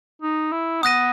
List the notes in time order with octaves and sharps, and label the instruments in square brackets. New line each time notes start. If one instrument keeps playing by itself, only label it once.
[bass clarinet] D#4
E4
[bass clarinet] B3 [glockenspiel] D#6 F#6 A#6 D#7